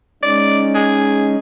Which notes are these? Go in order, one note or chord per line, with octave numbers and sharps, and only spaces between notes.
G#3 C#4 D#4 D5
G#4